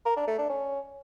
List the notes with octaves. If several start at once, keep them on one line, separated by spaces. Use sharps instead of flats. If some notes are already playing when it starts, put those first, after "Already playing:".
A#4
D4
A3
D4
C#4